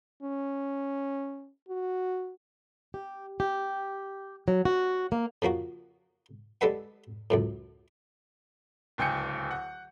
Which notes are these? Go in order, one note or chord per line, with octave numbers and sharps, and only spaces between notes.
C#4
F#4
G4
G4
F#3
F#4
A#3
C#3 F3 A#3 F#4
G3 G#3 D4 A4 B4 F#5
C#2 F#2 A2
D1 C#2 G5 G#5 G6 C#7
F#5